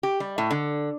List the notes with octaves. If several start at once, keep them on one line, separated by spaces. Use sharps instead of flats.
G4
G3
A2
D3